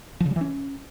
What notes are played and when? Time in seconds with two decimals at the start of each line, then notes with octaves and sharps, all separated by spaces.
0.20 F3
0.26 C#3
0.31 G3
0.36 E3
0.41 C#4